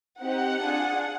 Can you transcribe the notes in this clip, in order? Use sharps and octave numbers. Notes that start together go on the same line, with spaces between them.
C4 D#4 G4 F#5
D4 F4 G#4